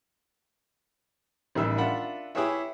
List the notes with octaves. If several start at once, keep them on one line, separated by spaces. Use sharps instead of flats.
A1 D#3 G3 E5 E6
D4 F4 A#4 E5 F#5 B5
E4 G4 G#4 B4 C#5 E5